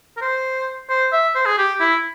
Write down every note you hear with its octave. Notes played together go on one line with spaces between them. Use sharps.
A#4
C5
C5
E5
C5
G#4
G4
E4